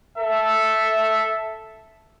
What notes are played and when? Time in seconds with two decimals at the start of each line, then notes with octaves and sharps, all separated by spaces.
0.18 A4 E5